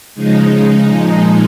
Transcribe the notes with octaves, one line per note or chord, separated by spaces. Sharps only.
C#3 F3 G#3 D#4
C#3 G#3 D#4
A#2 F3 G#3